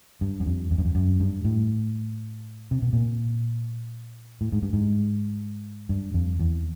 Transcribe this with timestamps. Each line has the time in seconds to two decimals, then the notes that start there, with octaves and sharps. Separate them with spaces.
0.21 G2
0.40 F#2
0.46 F2
0.71 F2
0.78 F#2
0.85 F2
0.95 F#2
1.20 G2
1.45 A2
2.71 C3
2.82 B2
2.93 A#2
4.41 A2
4.52 G#2
4.62 G2
4.73 G#2
5.89 G2
6.14 F2
6.39 E2